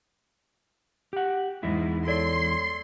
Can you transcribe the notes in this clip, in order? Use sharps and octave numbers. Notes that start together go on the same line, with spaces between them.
G4 F#5
E2 G#2 G#3 E4
A4 C#5 D5 C6